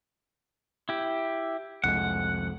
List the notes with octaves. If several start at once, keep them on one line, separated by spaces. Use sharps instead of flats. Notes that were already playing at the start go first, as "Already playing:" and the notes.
E4 G4
C2 F2 G#3 F#5